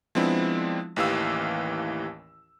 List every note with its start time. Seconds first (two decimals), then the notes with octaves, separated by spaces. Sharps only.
0.15 F3 G#3 B3 C4 D4 E4
0.96 A1 D#2 E3 G4 F5 E6